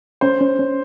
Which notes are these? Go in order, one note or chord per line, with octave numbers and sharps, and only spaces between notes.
C#4 C5
C#4
C#4